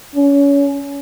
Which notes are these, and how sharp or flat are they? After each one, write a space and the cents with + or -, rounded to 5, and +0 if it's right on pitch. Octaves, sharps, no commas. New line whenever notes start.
C#4 +25